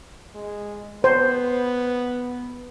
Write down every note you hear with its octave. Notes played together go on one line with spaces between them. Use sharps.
G#3
B3 C5